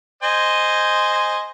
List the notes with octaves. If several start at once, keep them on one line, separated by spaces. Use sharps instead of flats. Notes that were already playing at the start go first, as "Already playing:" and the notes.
C5 D#5 G#5